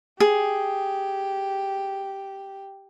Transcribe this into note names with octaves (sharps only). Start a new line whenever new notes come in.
G4 G#4